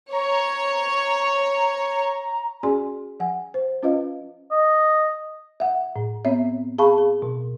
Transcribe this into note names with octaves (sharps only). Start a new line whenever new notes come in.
C#5 A#5
C#4 F#4 G#4 D5 G#5 C6
F3 F#5 G#5
C5
C#4 F4 B4 D#5 F5
D#5
E5 F#5
A2
B3 C4 C#5 E5
G#4 F5 A5 B5 C#6
G#4
B2